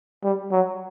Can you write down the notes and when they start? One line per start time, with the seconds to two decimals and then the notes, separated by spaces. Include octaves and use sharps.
0.24 G3
0.52 F#3